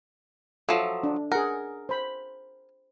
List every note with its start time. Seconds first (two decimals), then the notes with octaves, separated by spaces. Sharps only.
0.69 F3 F#3 A4 E5
1.03 D4
1.32 G#4 A#4 F#5
1.89 C5 B5